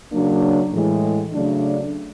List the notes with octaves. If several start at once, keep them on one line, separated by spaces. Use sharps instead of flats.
C#3 F#3 A#3 D4
A2 E3 G#3
C#3 F#3 A3 D4